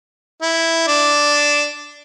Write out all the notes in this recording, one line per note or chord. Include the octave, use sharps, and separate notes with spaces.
E4
D4